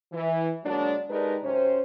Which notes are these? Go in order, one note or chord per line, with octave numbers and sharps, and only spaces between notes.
E3
D3 F#3 G#3 A#3 D4
G#3 D4 D#4 G4 A#4 B4
F#2 C3 C#4 C5